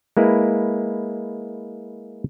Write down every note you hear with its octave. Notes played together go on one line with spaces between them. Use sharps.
G#3 A#3 E4 B4